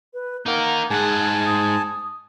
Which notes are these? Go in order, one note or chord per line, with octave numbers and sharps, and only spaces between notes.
B4
A#3 D#4 A#4 F#5
G#2 G#4 F#5 G#5 A5
D#6